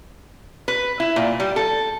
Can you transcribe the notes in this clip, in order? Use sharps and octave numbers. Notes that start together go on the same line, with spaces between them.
B4
E4
A#2
G3
A4